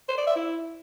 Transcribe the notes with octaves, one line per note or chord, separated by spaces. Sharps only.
C5
D5
E5
E4